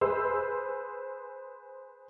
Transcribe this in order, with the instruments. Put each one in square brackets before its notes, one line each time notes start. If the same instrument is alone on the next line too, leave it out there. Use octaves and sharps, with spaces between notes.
[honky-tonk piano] G#4 B4 C5 E6